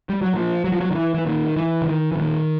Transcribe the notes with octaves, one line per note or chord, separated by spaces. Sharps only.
G3
F#3
A#2 F3
F#3
F3
F#3
D#3
E3
E3
A#2 D#3
E3
D3
D#3
E3
A#2 D#3